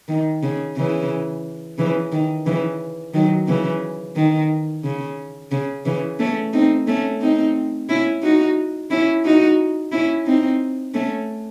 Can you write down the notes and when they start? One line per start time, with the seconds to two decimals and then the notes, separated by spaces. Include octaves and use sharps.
0.08 D#3
0.43 C#3
0.76 C#3 E3
1.78 C#3 E3
2.12 D#3
2.46 C#3 E3
3.14 D#3 F#3
3.48 C#3 E3
4.16 D#3
4.83 C#3
5.51 C#3
5.85 C#3 E3
6.19 A3 C#4
6.53 C4 D#4
6.87 A3 C#4
7.21 C4 D#4
7.89 C#4 E4
8.23 D#4 F#4
8.91 C#4 E4
9.25 D#4 F#4
9.92 C#4 E4
10.26 C4 D#4
10.94 A3 C#4